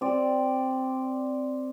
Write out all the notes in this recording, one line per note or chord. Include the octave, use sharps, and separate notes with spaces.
C4 D5